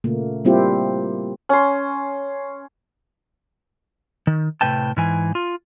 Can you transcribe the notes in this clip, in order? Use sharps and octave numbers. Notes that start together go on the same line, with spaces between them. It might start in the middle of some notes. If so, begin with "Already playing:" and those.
A#2 C#3 A3 A#3
G3 A#3 C4 E4 F4 G4
C#4 C6
D#3
A2 C3 G3 B4 G5 A5
G#2 E3 G#5
F4